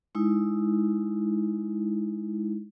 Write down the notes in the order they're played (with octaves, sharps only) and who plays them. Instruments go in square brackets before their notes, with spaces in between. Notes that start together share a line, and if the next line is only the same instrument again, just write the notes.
[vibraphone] G#3 D#4 E4